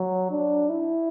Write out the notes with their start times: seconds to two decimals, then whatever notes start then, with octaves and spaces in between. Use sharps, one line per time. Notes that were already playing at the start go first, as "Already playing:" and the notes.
Already playing: F#3
0.30 D4
0.69 E4